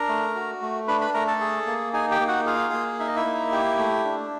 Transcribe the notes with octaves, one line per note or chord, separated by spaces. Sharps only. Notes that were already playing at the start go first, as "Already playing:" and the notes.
Already playing: D4 A#4 A#5
A3
F#4
A3
D4 B4 B5
B4 B5
A3 A#4 A#5
A4 A5
G#4
A#3
D#4 G#4 G#5
G4 G5
A#3
F#4 F#5
F4 G#4 F5
A#3
D#4 E5
D#5
E4 E5
A#3
G4
A3
D4